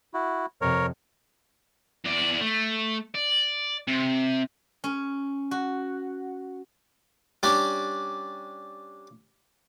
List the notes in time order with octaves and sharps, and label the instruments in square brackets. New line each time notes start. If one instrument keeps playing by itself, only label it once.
[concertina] E4 F#4
[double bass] F2 C3 [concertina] A#4 C#5
[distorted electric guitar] E2 D5
A3
D5
C3
[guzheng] C#4
F#4
[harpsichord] G3 C#4 D4